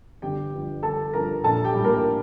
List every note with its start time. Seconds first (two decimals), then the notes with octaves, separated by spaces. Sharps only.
0.22 G1 G4 G5
0.53 G2 F3
0.83 G1 A4 A5
1.13 G2 F3 A#4 A#5
1.44 A#1 A4 A5
1.64 G4 G5
1.74 A2 G3
1.84 A#3 A#4